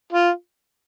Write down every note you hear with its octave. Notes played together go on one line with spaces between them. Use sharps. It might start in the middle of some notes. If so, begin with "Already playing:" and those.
F4